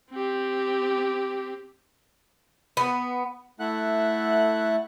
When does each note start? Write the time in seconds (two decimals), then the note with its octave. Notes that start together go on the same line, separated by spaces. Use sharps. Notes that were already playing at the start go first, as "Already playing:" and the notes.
0.11 C4 G4
2.77 B3
3.60 A3 E4 A4 E5 F#5 F#6